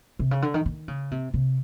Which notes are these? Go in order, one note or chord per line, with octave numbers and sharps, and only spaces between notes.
C3
C#3
D3
D#3
D#3
C#3
C3
C3